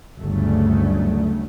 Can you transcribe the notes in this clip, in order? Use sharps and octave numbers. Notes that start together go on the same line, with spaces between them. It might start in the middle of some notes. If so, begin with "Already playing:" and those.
G1 D2 G2 C#3 F#3 A3